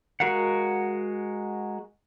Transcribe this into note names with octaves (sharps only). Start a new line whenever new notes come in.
G#3 F#4 A#4 F5 F#5